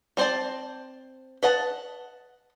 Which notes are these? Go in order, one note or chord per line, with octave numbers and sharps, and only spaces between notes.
G3 C4 C5 D5 A5
B4 D#5 F#5 A5